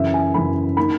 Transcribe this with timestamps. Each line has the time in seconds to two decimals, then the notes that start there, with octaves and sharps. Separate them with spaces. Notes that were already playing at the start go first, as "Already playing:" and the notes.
Already playing: F#2 C#3 E3 E5
0.14 G#5
0.34 F#2 C#3 E3 B5
0.77 D#3 A#3 D#4 B5